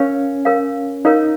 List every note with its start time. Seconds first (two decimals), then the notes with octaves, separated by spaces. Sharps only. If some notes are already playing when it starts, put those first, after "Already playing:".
Already playing: C#4 A#4 C#5 F5
0.45 A#4 C#5 F5
1.05 D#4 A#4 C#5 F5